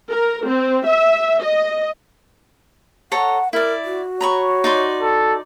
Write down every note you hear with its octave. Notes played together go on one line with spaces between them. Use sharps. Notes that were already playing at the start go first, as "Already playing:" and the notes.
A#4
C4
E5
D#5
A4 C#5 F#5 A#5
E4 A#4 D5
F#4
C#5 A#5 B5 C#6
D#4 D5 C6
A4